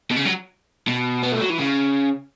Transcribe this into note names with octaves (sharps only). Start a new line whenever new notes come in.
B2
C#3
F#3
B2
B3
A3
F#3
E3
C#3